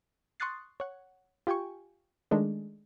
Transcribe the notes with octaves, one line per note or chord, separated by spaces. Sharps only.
C6 C#6 D#6 F#6 A6 C7
C#5 F#5
F4 G4 G5 G#5 C#6
D#3 G#3 A3 D4